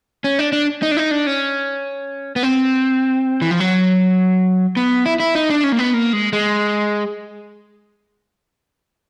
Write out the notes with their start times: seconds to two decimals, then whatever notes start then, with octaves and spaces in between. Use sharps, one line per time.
0.24 C#4
0.39 D4
0.53 D4
0.82 D#4
0.91 D4
0.97 D#4
1.11 D4
1.27 C#4
2.36 B3
2.43 C4
3.42 E3
3.51 F3
3.60 F#3
4.77 B3
5.06 E4
5.20 E4
5.35 D#4
5.50 D4
5.64 C#4
5.72 A#3
5.79 B3
5.94 A#3
6.13 G#3
6.33 G#3